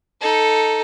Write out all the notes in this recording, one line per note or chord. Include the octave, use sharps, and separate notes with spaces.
D#4 A4